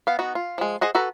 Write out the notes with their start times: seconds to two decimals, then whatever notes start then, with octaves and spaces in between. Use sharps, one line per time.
0.07 B3 F5
0.19 B3 D#4 F#4
0.35 F4
0.58 F3 G#3
0.81 G#4 C5 D#5 F#5
0.95 F#4 A4 B4 A#5